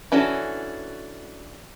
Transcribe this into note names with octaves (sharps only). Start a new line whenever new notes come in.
E3 C#4 D4 F#4 A4